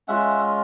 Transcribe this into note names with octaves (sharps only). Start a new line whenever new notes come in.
G#3 C#4 F4 E5 F#5